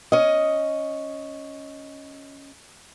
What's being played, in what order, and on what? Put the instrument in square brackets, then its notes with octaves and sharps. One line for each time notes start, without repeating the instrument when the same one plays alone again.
[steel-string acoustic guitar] C#4 D#5